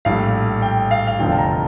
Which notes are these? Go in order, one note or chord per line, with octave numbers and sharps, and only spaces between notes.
A#1 A2 G3 F5
G5
F5
F5
F1 E2 D3 F3 G5
A5
A#5